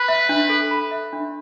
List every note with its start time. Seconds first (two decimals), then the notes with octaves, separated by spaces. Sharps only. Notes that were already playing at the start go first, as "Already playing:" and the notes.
Already playing: B4 B5
0.08 E5
0.29 D4
0.50 A4
0.71 B5
0.91 E5
1.13 D4